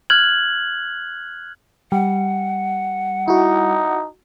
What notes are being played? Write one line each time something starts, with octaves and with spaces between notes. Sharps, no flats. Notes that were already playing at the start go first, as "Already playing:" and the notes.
F6 F#6 G#6 F#7
G3 F#5
D#4 E4 F#4